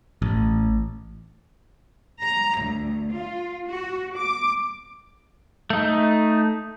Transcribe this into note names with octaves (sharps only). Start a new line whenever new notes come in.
A1
A#5
D2
F4
F#4
D6
A3 D#4